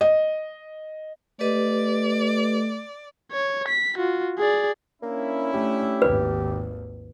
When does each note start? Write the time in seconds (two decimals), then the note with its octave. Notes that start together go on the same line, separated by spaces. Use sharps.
0.01 D#5
1.40 A3 G4 B4 D5 D#5
3.32 C#5
3.68 B6
3.98 F4 F#4
4.39 G#4 D5
5.02 A#3 C#4 D4 E4
5.54 A3 G4
6.02 G#1 D#2 B4